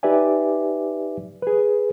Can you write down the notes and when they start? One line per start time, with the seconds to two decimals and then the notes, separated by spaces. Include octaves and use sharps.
0.03 D#4 G4 B4 D5 E5 G#5
1.42 G#4 B4